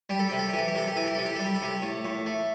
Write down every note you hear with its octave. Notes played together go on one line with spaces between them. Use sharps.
G3 G4
A4
C3 G4
A4
G4
E3 A4
G4
C3 A4
G4
E3 A4
G4
C3 A4
G4
G3 A4
G4
A4
C3 G4
A2
A2
A3